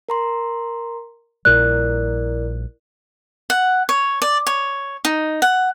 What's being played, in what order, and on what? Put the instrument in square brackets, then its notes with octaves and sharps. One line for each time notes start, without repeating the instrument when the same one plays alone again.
[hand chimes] A#4 A#5 C6
[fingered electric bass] A#1 A#2 G3 [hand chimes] E4 A#4 D5 [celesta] F#6
[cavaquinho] F#5
C#5
D5
C#5
D#4
F#5